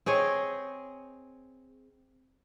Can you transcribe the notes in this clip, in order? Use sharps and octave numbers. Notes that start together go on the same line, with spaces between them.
C4 G#4 C#5 D#5